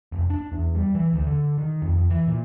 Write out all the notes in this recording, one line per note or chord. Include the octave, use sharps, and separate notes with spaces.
F1
D4
E2
G3
E3
D2
D3
D#3
F2
F2
E3
A#2